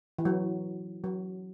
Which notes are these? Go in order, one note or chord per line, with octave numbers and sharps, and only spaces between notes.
E3
F#3
F#3